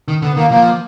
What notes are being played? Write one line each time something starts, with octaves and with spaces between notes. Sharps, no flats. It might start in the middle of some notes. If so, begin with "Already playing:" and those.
D#3
D3 B3
D#3 A#3
F3 A#3